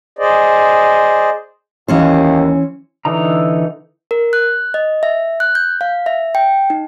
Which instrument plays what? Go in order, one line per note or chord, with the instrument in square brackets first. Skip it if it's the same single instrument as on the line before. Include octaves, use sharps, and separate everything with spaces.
[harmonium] G#4 C5 D5 D#5
[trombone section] D#2 [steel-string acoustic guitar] E3 C#4 C5
[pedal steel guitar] D3 E3 D#4 A#5
[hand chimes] A#4
F#6
D#5
E5
F#6
G6
F5
E5
G5
D#4